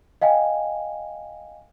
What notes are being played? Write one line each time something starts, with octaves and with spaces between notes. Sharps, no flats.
D#5 F5 G5 G#5